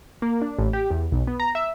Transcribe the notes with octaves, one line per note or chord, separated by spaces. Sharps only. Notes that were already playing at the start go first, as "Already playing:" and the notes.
A#3
D4
A1
G4
E2
B1
B3
A#5
E5